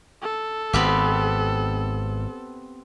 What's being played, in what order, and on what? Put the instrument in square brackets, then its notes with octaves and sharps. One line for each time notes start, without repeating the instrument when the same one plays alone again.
[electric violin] A4
[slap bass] G#1 [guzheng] B3 C4 G4